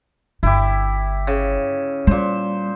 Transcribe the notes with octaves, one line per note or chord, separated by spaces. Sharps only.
G1 E4 G4
C#3
A#2 G3 C5